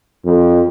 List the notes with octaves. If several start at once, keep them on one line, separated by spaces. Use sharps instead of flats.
F2